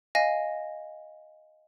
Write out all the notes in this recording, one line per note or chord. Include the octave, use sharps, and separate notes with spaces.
D#5 F5 G#5 A#6